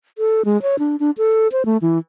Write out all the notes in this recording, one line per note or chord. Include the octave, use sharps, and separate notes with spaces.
A4
G#3
C#5
D4
D4
A4
C5
A3
E3